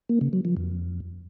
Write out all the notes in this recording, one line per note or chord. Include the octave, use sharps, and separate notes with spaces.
A#3
C#3
F#3
F3
F2